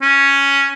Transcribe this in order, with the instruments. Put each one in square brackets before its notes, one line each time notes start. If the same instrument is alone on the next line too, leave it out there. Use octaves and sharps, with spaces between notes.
[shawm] C#4